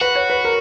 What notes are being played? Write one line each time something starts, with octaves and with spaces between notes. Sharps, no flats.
F#4 B4
C#5
B4
A#4